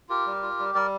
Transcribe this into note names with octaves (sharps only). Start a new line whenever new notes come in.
F4 G4 A#4
G3
F4
G3
G3 A#4 D5